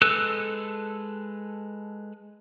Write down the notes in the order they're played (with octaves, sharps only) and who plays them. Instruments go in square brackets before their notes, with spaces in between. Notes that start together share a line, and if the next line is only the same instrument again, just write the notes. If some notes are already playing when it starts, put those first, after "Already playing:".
[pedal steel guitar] G#3 A4 B4 E6 F#6